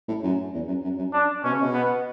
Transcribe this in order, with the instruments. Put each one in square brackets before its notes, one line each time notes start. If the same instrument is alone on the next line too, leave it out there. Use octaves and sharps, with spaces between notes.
[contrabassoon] A2
F#2
E2
F#2
F#2
F#2
[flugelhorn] D4
[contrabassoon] B2 [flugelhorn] C#4
[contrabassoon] C#3
B2
[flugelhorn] B3